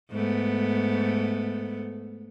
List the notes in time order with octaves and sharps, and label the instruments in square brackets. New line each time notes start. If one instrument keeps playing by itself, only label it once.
[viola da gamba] G#2 A3 B3